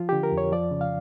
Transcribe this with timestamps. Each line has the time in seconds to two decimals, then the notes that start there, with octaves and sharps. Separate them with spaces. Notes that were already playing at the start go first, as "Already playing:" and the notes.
Already playing: F3 F4
0.09 D3 G4
0.23 A#4
0.32 F2
0.38 C#5
0.52 F3 D5
0.71 C#3
0.81 F5